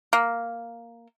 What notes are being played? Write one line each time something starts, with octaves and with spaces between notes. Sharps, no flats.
A#3